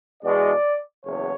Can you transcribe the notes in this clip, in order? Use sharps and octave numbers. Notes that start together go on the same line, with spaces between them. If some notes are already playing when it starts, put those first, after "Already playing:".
E2 B2 G#3 D5
F#1 E2 C#5